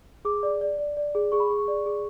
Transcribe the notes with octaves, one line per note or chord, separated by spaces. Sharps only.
G#4 D6
D5
D5
D5
D5
G#4
G#4 C#6
B5
C#6
G#4
C#6
D5
G#4